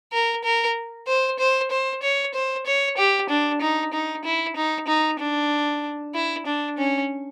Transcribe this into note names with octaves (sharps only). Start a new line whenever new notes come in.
A#4
A#4
C5
C5
C5
C#5
C5
C#5
G4
D4
D#4
D#4
E4
D#4
D#4
D4
E4
D4
C#4